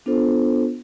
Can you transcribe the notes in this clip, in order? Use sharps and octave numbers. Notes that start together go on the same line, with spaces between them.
B3 D4 F4 A4 C5